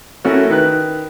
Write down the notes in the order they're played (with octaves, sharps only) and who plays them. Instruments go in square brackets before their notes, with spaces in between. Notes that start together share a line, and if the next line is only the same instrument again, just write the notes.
[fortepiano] A3 C#4 E4 F#4 A#4
D#3 B4 F#6